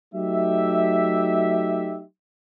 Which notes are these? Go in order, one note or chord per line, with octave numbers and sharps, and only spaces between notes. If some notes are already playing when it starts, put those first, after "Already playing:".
F#3 A3 D#4 G4 E5